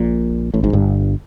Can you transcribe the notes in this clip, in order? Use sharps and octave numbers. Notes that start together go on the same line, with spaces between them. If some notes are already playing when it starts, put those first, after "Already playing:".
Already playing: A#1 A#2
A1 A2
G#1 G#2
G1 G2